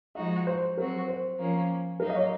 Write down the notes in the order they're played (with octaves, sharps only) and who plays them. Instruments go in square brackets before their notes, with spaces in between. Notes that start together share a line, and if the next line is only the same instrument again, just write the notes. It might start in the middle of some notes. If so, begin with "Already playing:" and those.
[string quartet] F3 G#3 D#4 F#4 [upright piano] D#5
[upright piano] C5
[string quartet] F#3 C4 F#4 [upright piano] A#4
[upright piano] C5
[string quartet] F3 A#3 C#4
[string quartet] F#3 A#3 D#4 [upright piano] A#4
[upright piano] D#5
C#5